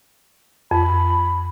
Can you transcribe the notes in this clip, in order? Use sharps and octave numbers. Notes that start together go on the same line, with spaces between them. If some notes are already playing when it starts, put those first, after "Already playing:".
F2 B5